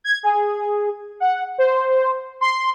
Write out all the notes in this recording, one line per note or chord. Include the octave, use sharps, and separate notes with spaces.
G#6
G#4
F#5
C5
C6